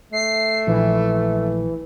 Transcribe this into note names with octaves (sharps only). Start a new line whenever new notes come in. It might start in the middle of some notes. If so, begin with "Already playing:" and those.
A3 C7
A#1 E3